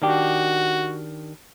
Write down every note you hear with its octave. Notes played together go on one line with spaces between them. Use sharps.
D#3 D4 F#4 G4